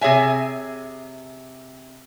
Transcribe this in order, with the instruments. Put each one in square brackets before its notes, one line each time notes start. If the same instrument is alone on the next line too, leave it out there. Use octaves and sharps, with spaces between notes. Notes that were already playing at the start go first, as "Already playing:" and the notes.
[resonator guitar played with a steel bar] C3 G#4 C#5 E5 G#5